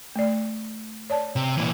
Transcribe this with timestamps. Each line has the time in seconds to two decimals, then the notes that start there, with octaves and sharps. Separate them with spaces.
0.16 A3 D5
1.10 C#5 D5 A5
1.36 C3
1.57 A#2 E3